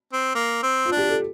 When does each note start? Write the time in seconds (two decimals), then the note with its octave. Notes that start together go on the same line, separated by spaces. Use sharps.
0.13 C4
0.35 A#3
0.63 C4
0.85 F4
0.92 D4
0.97 G4
1.09 A4